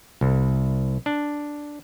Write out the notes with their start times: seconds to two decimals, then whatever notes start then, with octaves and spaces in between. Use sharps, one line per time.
0.21 C2
1.06 D4